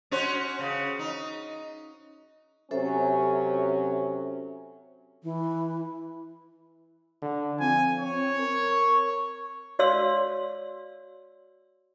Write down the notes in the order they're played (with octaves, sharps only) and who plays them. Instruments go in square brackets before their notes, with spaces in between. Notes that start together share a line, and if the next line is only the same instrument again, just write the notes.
[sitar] C#4 F#4 C5
C#3
D#4
[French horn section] C3 F#3 C#4 [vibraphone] A4 C5 E5
[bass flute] E3
[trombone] D3
[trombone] F3 [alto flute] C4 [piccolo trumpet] G#5
[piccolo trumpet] C#5
[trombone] A#4
[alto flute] C#6
[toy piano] F#4 C#5 D5 F5 C6 E6